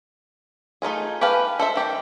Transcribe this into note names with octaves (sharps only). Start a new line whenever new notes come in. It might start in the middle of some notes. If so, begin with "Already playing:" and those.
A3 D#4 F4 G#4
G4 G#4 B4 F5 A5
A4 C5 E5
D#3 G4